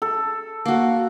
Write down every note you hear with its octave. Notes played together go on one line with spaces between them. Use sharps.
A4
A#3 F#4